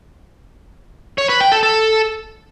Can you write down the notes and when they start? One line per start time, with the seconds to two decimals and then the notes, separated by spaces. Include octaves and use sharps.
1.18 C#5
1.29 B4
1.40 G5
1.52 A4
1.63 A4